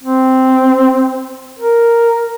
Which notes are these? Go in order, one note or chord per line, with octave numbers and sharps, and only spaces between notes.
C4
A#4